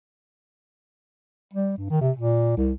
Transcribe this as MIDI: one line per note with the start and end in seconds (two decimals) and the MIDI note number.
1.54 1.75 55
1.78 1.87 43
1.90 1.99 51
2.01 2.11 48
2.16 2.53 46
2.57 2.72 36